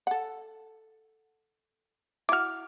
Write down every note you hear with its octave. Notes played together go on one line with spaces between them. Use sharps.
A4 F#5
E4 F#4 D6 F6